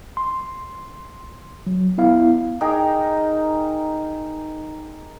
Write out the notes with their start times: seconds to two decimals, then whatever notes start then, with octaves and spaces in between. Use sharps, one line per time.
0.17 C6
1.67 F#3
1.98 B3 E4 F5
2.61 D#4 G#4 A#4 G5